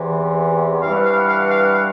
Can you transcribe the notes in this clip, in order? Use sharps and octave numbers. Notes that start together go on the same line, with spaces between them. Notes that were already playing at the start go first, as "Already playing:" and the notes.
Already playing: E2 C3 E3
G2 E3 G3 F5
F#5
F5
F#5
F5
F#5
F5
F#5
F5